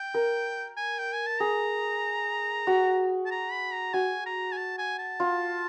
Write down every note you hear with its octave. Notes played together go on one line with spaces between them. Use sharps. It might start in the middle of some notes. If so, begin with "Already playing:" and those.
Already playing: G5
A#4
G#5
G5
G#5
A5
G#4 A#5
F#4
A5
A#5
B5
A#5
F#4 G#5
A#5
G#5
A5
G#5
A5
F4